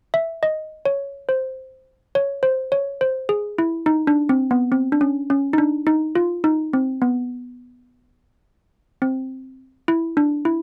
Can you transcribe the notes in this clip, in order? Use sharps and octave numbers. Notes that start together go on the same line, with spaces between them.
E5
D#5
C#5
C5
C#5
C5
C#5
C5
G#4
E4
D#4
D4
C4
B3
C4
D4
C#4
C#4
D#4
D4
D#4
F4
D#4
C4
B3
C4
E4
D4
E4